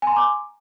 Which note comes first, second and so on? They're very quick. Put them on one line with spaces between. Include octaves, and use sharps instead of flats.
G#5 C6 A#5 D6